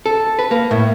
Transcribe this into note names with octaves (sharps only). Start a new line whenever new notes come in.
A4
B4
A#3
A2